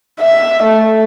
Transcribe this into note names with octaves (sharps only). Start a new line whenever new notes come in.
E5
A3